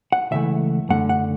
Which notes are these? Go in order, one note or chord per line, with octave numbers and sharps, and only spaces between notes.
F#5
C#2 C#3 E3 A3 E5
F#2 D3 A3 F#5
F#5